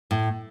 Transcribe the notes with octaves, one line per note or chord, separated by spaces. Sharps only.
A2